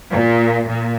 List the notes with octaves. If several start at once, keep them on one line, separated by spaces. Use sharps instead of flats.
A#2
A#2